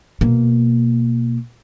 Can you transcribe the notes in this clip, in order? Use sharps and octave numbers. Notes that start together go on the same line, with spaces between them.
B2 A#3